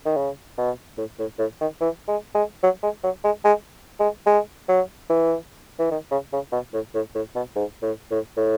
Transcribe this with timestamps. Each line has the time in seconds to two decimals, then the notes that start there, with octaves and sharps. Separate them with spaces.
0.06 D#3
0.17 C#3
0.58 B2
0.98 A2
1.19 A2
1.39 A2
1.61 D#3
1.80 E3
2.08 G#3
2.35 G#3
2.63 F#3
2.83 G#3
3.04 F#3
3.24 G#3
3.44 G#3
4.00 G#3
4.26 G#3
4.69 F#3
5.10 E3
5.79 E3
5.91 D#3
6.11 C#3
6.33 C#3
6.52 B2
6.73 A2
6.95 A2
7.15 A2
7.35 B2
7.55 G#2
7.83 A2
8.11 A2
8.37 A2